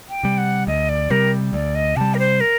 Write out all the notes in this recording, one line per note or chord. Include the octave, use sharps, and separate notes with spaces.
G5
C3 G3
F#5
D2 D#5
D5
C3 G3 A#4
D2 D5
D#5
C3 G3 A5
A#4
C5
A#4